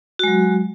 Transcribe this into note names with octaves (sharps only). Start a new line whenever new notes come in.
F#3 G#3 F#4